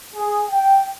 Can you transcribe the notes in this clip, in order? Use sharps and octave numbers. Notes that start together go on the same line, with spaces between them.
G#4
G5